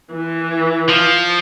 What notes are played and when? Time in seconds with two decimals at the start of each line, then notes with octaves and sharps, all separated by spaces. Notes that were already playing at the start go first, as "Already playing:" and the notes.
0.13 E3
0.89 F3